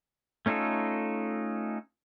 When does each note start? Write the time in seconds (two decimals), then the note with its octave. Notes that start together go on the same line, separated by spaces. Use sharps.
0.46 A3 C#4 D#4 F4 A4